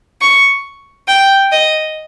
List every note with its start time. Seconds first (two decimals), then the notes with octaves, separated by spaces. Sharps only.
0.21 C#6
1.08 G5
1.52 D#5